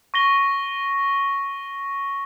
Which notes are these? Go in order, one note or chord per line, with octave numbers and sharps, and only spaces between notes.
C#6 A#6 G7